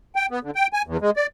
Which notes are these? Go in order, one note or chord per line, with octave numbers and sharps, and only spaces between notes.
G5
B3
D3
G5
G#5
E2
G#3
D5